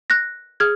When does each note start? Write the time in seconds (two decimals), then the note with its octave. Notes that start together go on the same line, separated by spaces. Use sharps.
0.10 F#6 A#6
0.60 G#4 F6 G#6